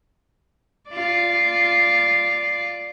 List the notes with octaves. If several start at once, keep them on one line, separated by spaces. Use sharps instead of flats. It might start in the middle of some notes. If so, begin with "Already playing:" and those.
F4 D5